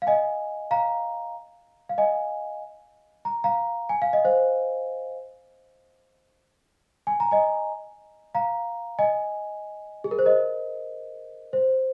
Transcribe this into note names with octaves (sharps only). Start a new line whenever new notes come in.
F5
D#5 G#5
F5 A#5
F5
D#5 G#5
A#5
F5 A#5
G#5
F5
D#5
C5 F5
G#5
A#5
D#5 G#5
F5 A#5
D#5 G#5
G#4
A#4
C5
A#4 D#5
C5